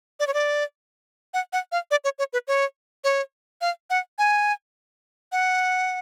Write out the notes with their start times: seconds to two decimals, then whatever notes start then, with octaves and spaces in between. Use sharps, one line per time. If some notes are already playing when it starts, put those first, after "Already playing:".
0.20 D5
0.27 C#5
0.34 D5
1.34 F#5
1.53 F#5
1.72 F5
1.91 D5
2.04 C#5
2.19 C#5
2.33 B4
2.48 C#5
3.04 C#5
3.61 F5
3.90 F#5
4.18 G#5
5.32 F#5